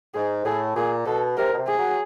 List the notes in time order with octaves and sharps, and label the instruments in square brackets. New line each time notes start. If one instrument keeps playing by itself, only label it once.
[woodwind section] G#2 [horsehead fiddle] G#4
[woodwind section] A2 [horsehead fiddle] G#4
[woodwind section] A#2 [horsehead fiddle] G#4
[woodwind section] B2 [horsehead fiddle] A4
[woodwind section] C3 [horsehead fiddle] A#4
[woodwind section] B2
C3
[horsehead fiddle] G#4
[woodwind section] F#3